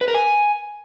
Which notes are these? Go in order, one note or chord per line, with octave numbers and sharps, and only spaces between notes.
B4
A#4
G#5